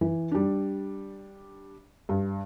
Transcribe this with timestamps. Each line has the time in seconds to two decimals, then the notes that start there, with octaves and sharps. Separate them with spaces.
0.01 E3
0.32 G3 D4
2.09 G2